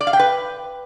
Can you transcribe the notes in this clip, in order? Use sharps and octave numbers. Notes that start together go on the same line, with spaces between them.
D5
F5
G5
B4